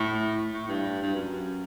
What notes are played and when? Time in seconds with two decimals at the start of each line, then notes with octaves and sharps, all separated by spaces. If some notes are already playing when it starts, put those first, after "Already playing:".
Already playing: A2
0.53 A2
0.68 G2
1.02 G2
1.14 F#2